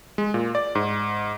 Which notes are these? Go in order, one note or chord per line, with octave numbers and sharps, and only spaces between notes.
G#3
A#2
D5
G#2